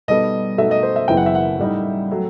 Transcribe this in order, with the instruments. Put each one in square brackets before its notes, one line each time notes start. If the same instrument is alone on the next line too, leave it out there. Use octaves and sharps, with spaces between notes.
[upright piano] B2 G3 B3 D#4 A4 [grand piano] D#5
[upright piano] B2 A3 D#4 F#4 A4 [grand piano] E5
[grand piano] D#5
C5
E5
[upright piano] F#1 F#2 E3 B3 E4 [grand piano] G5
[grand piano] F#5
E5
F#5
[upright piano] A2 G3 D#4
F#3 A3